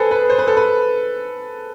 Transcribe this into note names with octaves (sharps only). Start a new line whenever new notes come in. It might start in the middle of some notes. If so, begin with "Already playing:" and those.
Already playing: G#4 A4 B4 C5
B4
C5
B4
A4
B4